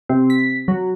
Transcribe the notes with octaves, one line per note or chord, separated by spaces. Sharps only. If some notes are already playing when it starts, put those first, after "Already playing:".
C3
B6
F#3